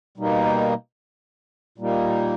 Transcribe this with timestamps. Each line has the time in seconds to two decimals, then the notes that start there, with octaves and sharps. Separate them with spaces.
0.18 B2 G3 A#3 D#4
1.78 A#2 G3 A#3 D#4